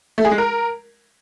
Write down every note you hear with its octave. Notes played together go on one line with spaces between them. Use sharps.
A3
G#4
G#3
A#4